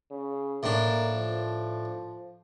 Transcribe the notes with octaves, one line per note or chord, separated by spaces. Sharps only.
C#3
A2 A#3 D4
F3